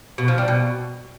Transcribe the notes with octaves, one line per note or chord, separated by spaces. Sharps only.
B2
F3
G3
B2